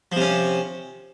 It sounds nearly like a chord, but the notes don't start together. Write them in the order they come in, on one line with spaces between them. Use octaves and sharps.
F3 C3 C#4